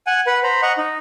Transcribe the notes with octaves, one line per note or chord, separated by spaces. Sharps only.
F#5 G#5
B4 F#5
C5 A#5 B5
D#5 F#5 A#5 C#6
D#4